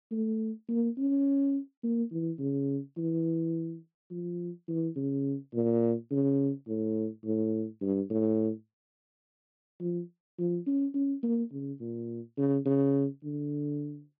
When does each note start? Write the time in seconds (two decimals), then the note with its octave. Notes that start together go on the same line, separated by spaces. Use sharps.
0.11 A3
0.69 A#3
0.98 C#4
1.84 A#3
2.12 E3
2.39 C#3
2.97 E3
4.11 F3
4.68 E3
4.96 C#3
5.54 A#2
6.11 C#3
6.68 A2
7.25 A2
7.82 G2
8.10 A2
9.80 F3
10.39 F3
10.67 C#4
10.94 C#4
11.23 A#3
11.52 C#3
11.81 A#2
12.38 C#3
12.66 C#3
13.23 D3